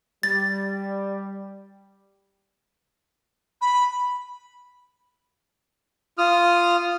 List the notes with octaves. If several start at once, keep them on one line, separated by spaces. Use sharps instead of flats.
G3 A6
B5
F4 D#6 F6